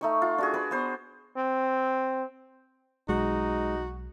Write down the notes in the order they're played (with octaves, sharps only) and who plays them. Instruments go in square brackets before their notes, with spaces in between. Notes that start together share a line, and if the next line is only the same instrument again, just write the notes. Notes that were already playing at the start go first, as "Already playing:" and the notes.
[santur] A3 D#4 C#6
F4
D4 F#4 G#4
B4 D5
B3 C5
[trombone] C4
[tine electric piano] B1 [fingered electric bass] G#3 [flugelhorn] D#4 [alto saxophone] F#4